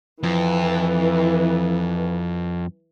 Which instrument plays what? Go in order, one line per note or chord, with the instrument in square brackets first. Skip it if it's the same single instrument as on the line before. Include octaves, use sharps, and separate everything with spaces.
[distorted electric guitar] F2 [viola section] E3